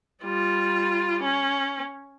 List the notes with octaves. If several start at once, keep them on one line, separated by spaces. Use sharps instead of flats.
G3 F4
C#4